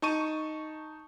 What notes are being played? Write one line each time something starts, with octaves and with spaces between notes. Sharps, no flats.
D#4 A5 C#6 D#7